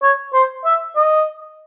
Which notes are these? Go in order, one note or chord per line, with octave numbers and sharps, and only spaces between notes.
C#5
C5
E5
D#5